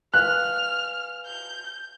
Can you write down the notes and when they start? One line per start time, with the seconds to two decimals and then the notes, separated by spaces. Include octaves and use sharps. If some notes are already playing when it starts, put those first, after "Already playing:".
0.14 B4 F5 G#5 F6 F#6
1.26 G6